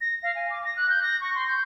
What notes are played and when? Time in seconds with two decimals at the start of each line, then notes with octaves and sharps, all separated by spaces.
0.01 A#6
0.23 F5
0.36 G#5
0.50 D6
0.64 A#6
0.77 F#6
0.89 G6
1.03 A#6
1.21 C#6
1.35 C6
1.48 G6